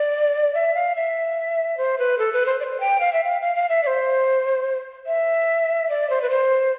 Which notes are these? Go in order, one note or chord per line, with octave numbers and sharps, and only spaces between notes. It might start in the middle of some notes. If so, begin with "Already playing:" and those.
Already playing: D5
E5
F5
E5
C5
B4
A4
B4
C5
D5
C5
G5
F5
E5
F5
F5
F5
E5
D5
C5
E5
D5
C5
B4
C5